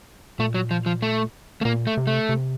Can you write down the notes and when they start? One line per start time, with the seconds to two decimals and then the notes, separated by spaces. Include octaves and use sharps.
0.39 A#2 A3
0.54 F#3
0.71 F3
0.86 F3
1.02 A3
1.61 A3
1.65 A#2 A#3
1.87 A3
1.97 C3
2.07 A3
2.29 C3